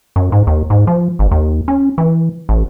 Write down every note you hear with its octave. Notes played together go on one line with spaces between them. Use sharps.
F#2
G#2
D#2
G#2
F3
G#1
D#2
C#4
E3
A1